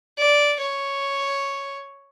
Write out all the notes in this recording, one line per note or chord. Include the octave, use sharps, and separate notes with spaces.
D5
C#5